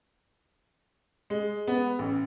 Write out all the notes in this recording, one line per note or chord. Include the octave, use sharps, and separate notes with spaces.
G#3
B3
A1